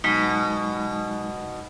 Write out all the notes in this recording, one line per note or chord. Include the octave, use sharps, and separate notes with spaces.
B2 F#3 G#3 D#4